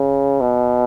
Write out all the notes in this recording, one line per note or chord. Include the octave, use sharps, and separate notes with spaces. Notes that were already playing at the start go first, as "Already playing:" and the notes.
Already playing: C#3
B2